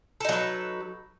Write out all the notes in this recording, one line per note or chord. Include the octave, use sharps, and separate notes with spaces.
F#3 D#4 A4 B4